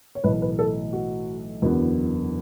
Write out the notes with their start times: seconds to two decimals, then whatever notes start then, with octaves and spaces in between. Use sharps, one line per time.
0.15 C#5
0.24 B1 A2 E3 A3 B4
0.42 B4
0.59 A4
0.93 F#4
1.62 F#1 E2 D3 F#3 B3